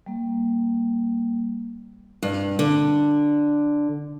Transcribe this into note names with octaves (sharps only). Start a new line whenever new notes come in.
G3 A#3
G2
D3